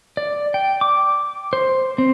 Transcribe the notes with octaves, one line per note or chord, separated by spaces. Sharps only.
D5
G5
D6
C5
C4